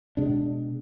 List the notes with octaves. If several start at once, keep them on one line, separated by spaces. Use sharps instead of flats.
B2 G#3 D4